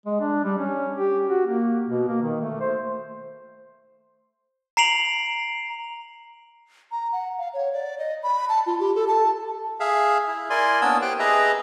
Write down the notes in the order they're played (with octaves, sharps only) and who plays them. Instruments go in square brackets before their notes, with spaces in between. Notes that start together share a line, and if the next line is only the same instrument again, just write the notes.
[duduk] G#3
D4
G3
C#4
G4
F#4
A#3
B2
A#3
D#3
A3
C5
[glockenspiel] A#5 C7 D7 F7 F#7
[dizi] A#5
F#5
F5
C#5
D5
D#5
B5
A5
F4
G4
A4
A5
[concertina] G#4 E5 F5
E4
E4 A#4 D5 G#5 C6
A#3 B3 C#4 D4 D#6 E6
G4 C5 G5 F#6
G#4 B4 D#5 E5 A#5